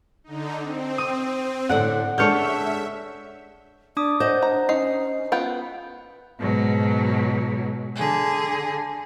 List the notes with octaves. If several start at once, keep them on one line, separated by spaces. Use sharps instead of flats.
D3 D#4
C4
D#6
A2 D3 D4 F#5
G#3 D4 A4 C#5 E5 F6 G6
D4 D5 D6 D#6
C5 D#5 F#5 G6
D4 A#5
C#4 D#4 C7
B3 F4 G5
G#2 B2 F#3
D3 G#4